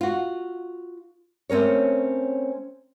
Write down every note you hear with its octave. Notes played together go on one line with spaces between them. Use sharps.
F4 F#4
A3 C4 C#4 A#4 C#5